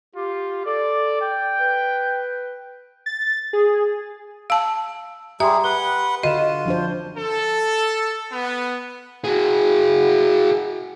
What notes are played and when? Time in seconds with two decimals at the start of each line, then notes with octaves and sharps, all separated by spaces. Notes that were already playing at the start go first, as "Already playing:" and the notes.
0.15 F4 G4
0.66 A4 D5
1.21 G5
1.59 B4
3.06 A6
3.53 G#4
4.50 F5 A5 E6
5.40 G3 G4 G#4 E5 A#5 C6
5.64 B4 F#5 G7
6.23 D3 F4 F#4 D#5 D#7 E7
6.66 F3 D4 C5
7.18 A4
8.32 B3
9.24 F#4 G#4